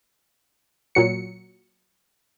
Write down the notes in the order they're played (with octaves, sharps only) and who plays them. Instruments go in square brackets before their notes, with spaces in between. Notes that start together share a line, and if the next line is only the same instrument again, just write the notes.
[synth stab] A#2 F#3 C#7